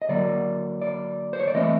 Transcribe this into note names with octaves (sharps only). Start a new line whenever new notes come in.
D#5
D3 F#3 A#3 D5
D5
C5
C#5
D5
E3 A3 C4 D#5